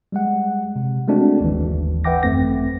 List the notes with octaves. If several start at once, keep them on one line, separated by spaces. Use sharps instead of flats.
G3 G#3 F#5
C3
G#3 A3 C4 D4 F#4
G1 D#2 E3
B4 E5 F#5 G5 D6 A#6
G#1 F#2 A3 C4 A#6